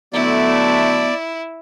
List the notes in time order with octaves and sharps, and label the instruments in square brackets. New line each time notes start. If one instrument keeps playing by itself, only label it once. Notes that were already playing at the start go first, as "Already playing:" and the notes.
[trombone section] D3 F#3 A3 [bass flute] B3 [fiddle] E4 [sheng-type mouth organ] D5